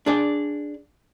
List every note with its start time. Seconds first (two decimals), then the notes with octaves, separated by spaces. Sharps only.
0.06 D4 G#4 D5